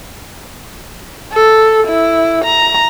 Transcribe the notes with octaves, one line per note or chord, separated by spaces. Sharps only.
A4
E4
A#5